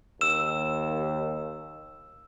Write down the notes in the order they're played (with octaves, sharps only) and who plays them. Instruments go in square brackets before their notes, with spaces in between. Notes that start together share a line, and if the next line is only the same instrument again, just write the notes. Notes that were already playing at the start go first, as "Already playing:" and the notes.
[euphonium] D#2 [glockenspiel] E6 E7